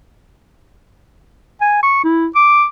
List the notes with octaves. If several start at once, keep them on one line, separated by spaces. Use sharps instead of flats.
G#5
C#6
E4
D6